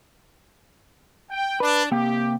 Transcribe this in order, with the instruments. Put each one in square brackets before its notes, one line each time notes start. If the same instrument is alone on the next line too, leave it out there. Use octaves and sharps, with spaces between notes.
[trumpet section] G5
[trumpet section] D4 [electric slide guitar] B4
[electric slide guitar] C3 A#3 G5 [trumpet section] G4